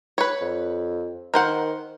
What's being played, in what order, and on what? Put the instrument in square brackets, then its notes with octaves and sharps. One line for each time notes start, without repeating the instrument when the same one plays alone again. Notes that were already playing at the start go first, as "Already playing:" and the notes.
[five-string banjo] B4 C#5
[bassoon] F2
[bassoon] D#3 [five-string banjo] A#4 C5 F#5